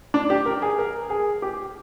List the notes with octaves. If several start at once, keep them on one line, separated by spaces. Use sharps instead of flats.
D4
G4
A#4
G#4
A#4
G#4
G4